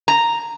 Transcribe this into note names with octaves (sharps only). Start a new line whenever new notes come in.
A#5